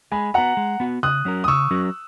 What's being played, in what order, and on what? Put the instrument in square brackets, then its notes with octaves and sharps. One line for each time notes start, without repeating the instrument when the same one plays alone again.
[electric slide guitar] G#3 [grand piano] G#5 B5
[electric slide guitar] B3 F#4 [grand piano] F#5 A#5
[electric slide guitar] G#3
B3 F#4
[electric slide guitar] C#3 [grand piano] D#6 F#6
[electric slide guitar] F#3 C#4 F#4 A#4
[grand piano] D#6
[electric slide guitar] C#3 [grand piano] C#6 E6
[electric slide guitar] F#3 C#4 F#4 A#4